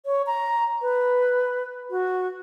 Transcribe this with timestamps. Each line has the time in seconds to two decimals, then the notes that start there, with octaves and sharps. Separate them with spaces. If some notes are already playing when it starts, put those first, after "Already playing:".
0.06 C#5
0.27 A#5
0.82 B4
1.90 F#4